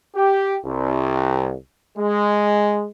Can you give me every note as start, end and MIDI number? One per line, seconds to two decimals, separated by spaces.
0.15 0.57 67
0.66 1.54 36
1.98 2.87 56